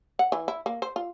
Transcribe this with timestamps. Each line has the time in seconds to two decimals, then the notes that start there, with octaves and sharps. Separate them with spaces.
0.19 F#5
0.32 E3
0.48 E4
0.66 A#3
0.82 C5
0.96 F4